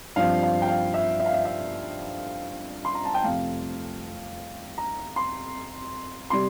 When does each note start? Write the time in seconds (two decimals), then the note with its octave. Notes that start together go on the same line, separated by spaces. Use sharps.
0.16 G2 F3 C4 F5
0.43 F5
0.62 G5
0.67 F5
0.94 E5
1.20 E5
1.26 F5
1.34 E5
1.45 E5
2.85 C6
2.95 A#5
3.05 A5
3.14 G5
3.24 F2 C3 F3 A3 F5
4.78 A#5
5.16 C6
6.30 C3 G3 C6